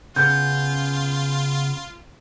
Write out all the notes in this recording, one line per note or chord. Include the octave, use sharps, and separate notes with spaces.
C#3 B3 C#4 F4 G6